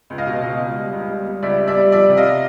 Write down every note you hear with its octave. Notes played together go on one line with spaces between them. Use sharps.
C#2
D#5 F5
B2
C#2
C#2
G3
C#2
G3
G3
C#2 D5 E5
G3
D5 E5
G3
F3 D5 E5
C3
D#5 F5